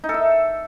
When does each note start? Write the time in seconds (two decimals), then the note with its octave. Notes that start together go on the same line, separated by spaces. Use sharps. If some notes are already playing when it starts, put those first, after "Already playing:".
0.04 D#4
0.09 A4
0.14 E5